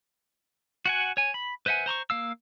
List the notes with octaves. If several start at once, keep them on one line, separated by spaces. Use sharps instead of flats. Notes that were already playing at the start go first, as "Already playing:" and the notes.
F#4 F#5 G#5
C#5 G#5
B5
B4 C5 E5 F#5 G#5
C5 A#5 C6 C#6
A#3 F5 E6